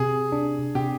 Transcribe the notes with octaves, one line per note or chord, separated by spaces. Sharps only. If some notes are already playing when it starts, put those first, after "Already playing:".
Already playing: C3 G#4
D4
C3 G4